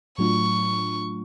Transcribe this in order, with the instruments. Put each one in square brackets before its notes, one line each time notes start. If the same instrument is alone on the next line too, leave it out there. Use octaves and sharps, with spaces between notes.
[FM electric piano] A2 F#3 A3 D4 F4 [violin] C#6